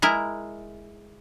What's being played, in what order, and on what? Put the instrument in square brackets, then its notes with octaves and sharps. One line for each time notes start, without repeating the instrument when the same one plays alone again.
[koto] G#3 E4 A#4